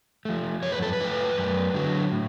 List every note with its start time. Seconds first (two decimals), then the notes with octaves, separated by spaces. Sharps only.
0.25 F3 A3
0.62 F#2 C#5
0.72 B4
0.82 A4
0.93 B4
1.00 F3 A3
1.37 F#2
1.74 D3 F#3
2.12 A2